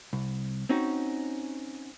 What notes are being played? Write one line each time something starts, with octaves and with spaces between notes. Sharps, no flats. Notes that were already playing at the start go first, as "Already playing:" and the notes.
C2
C4 C#4 D#4 F#4